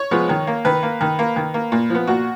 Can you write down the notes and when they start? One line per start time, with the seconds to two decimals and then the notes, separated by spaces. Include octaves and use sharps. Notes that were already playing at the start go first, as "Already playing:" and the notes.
Already playing: C#5
0.11 F3 G#3 B3
0.29 D#3
0.47 A#3
0.65 D#3 B4
0.83 A#3
1.01 D#3
1.19 A#3
1.36 D#3
1.54 A#3
1.72 A#2
1.90 F3 B3
2.07 A#2 F#4